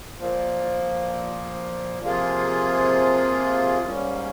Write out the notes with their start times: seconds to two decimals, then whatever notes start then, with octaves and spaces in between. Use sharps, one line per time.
0.18 A#2 F3 A#3
2.02 C3 F3 A#3 F4 G#4
3.86 G#2 G3 A#3 C#4